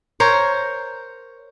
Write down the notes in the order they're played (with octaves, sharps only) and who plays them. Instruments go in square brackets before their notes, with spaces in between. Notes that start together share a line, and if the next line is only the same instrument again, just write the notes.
[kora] A#4 C5 C#5